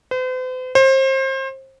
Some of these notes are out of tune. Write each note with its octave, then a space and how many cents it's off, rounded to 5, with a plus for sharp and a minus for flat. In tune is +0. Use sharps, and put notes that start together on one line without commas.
C5 -45
C5 +30